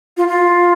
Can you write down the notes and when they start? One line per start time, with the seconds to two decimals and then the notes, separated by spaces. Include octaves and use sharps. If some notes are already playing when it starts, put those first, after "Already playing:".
0.17 F4
0.28 F4